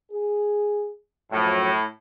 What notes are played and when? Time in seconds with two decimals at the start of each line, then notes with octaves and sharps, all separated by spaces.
0.11 G#4
1.31 F#2 A2 F3 F#3